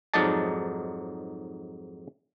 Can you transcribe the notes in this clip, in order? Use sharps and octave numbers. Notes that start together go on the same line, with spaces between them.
F2 G#2 F#3 D#4 D5 A5